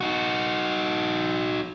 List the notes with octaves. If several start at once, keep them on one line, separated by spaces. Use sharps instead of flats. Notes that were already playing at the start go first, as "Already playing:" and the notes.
D#4 F#4